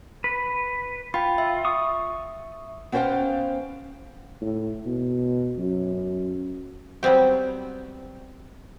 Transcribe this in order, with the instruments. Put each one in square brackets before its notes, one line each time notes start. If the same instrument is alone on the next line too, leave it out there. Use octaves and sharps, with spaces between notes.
[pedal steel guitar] B4
[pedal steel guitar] F4 [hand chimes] G5 B5
[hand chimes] E5
[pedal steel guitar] C#6 D#6
[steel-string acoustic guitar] B3 C#4 C5 C#5 F5 G5
[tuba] A2
B2
F#2
[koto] F#3 G3 B3 C4 G4